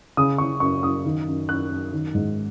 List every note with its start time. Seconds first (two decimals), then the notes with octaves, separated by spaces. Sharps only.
0.17 C#3 D#6
0.38 C#3 C#6
0.60 F#2 C#6
0.83 F#2 D#6
1.05 D#3
1.27 F#2
1.49 F#2 F#6
1.70 F#2
1.93 D#3
2.14 G#2